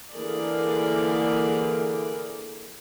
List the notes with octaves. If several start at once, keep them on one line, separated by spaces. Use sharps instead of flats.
D3 E3 A#3 G#4 A#4 D5